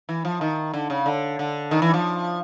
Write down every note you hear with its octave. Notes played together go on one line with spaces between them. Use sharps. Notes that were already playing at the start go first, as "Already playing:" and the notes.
E3
F3
D#3
D3
C#3
D3
D3
D#3
E3
F3